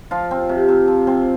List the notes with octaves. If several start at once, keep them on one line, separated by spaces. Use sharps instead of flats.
F3 F4
C4
C3
C3
F3
C4